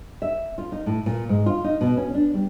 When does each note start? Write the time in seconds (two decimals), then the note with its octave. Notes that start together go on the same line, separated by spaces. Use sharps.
0.22 E5
0.58 F4
0.72 D#4
0.86 A2
1.06 A#2
1.29 G#2
1.46 F4
1.64 D#4
1.81 B2
1.97 C#4
2.14 D4
2.34 G3